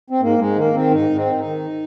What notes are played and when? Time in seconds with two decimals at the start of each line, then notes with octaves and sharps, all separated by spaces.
0.10 C4
0.21 G#2 A#3
0.39 G#2 G#3
0.56 D#3 A#3
0.74 D#3 C4
0.91 G#2 D#4
1.10 G#2
1.15 C4
1.26 D#3
1.39 D#4
1.45 D#3